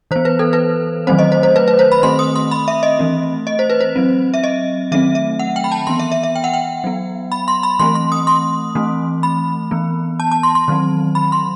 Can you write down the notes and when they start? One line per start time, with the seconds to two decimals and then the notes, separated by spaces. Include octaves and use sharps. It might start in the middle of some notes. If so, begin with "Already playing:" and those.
0.11 E3 B3 C5
0.25 B4
0.39 A4
0.53 B4
1.07 D#3 F#3 A3 C4 C5
1.19 D#5
1.32 C5
1.43 C5
1.56 B4
1.68 B4
1.79 C5
1.92 B5
2.03 D#3 A3 C4 C6
2.19 D#6
2.36 C6
2.51 B5
2.68 E5
2.83 D#5
2.99 E3 A3 C4
3.47 D#5
3.59 C5
3.70 B4
3.81 C5
3.96 F#3 C4
4.34 E5
4.44 D#5
4.92 D#3 F#3 A3 C4 E5
5.15 E5
5.39 F#5
5.56 G5
5.64 B5
5.72 A5
5.87 E3 B3 C6
5.99 E5
6.12 E5
6.23 E5
6.36 G5
6.44 F#5
6.54 G5
6.84 F#3 B3
7.32 B5
7.48 C6
7.63 B5
7.79 E3 A3 C4 C6
7.95 C6
8.12 D#6
8.27 C6
8.75 E3 A3 C4
9.23 B5
9.71 E3 B3
10.20 A5
10.32 A5
10.43 C6
10.55 C6
10.68 D#3 F#3 C4
11.15 B5
11.32 C6